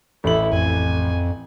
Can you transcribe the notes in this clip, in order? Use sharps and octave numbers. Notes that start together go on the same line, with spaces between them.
A1 E4 A4 F#7
F2 G#5